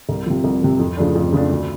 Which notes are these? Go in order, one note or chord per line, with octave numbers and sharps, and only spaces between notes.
C2
C3 F3
C2
C3 F3
F2
C#3 F3 A3 D4
F2
C#3 F3 A3 D4
D2